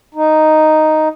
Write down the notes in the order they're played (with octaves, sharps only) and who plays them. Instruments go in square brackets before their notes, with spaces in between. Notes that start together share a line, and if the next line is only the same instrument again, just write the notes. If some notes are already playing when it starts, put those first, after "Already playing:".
[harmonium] D#4